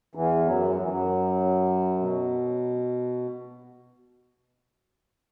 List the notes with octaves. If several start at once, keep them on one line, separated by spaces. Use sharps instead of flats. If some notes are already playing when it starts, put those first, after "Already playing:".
E2 E3
F#2 F#3
F#3
E3
F#2 F#3
B2